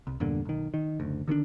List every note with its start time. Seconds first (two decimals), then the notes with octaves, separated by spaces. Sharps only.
0.07 C2
0.20 E2 G2 A#2 D3
0.45 B1 D#3
0.74 D#3
1.00 F#1 D2
1.28 D3 D#3 C#4 D4